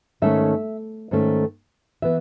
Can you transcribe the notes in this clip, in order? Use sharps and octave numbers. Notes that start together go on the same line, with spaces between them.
G#2 D#3 A3 C#4 E5
G#2 D#3 A3 C#4
E3 B3 E5